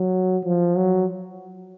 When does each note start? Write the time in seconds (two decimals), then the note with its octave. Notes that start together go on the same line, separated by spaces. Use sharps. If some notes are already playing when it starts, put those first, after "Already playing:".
Already playing: F#3
0.44 F3
0.77 F#3